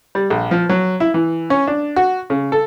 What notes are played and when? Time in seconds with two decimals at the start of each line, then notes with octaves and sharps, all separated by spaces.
0.15 G3
0.30 A#1
0.51 F3
0.69 F#3
1.00 E4
1.14 E3
1.50 C#4
1.67 D4
1.96 F#4
2.30 C#3
2.52 A4